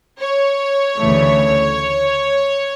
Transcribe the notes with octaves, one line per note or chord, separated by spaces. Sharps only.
C#5
D2 C#3 E3 A3